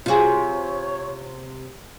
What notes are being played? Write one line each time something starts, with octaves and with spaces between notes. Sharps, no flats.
C3 F4 F#4 G#4 C#5